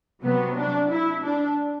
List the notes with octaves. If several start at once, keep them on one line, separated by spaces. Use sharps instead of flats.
C3 F#3 B3
D4
E4
D4